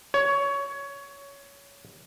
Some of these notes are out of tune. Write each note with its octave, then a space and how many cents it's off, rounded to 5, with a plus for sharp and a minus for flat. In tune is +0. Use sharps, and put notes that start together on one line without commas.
C#5 +15